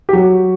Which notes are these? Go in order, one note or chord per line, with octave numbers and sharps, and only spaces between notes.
G4
F#3 F#4